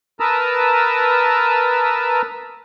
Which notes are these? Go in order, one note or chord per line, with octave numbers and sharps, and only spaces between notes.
A#4 B4 A5 A#5 D#6 E6